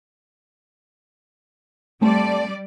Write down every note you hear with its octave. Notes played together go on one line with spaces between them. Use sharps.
G3 A3 C4 D5 A5